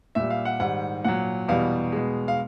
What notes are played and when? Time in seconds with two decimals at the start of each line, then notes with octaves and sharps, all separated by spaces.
0.15 A#2 G3 E5
0.30 F5
0.45 F#5
0.60 G#2 D#3 G3 F#5
1.04 A#2 F#3 F#5
1.48 E2 B2 G3 F5
1.92 B2 G#3
2.28 F5